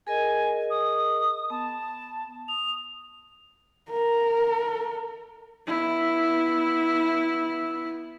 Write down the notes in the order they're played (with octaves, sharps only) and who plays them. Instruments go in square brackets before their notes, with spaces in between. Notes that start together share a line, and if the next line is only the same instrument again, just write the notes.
[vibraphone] G#4 A#4 D#5 [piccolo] G#5
[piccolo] D#6
[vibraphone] B3 [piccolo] A5
[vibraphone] D#6 [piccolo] F7
[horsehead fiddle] A#4
B3 E4